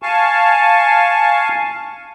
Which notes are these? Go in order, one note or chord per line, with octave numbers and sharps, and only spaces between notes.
F5 G#5 A5 C#6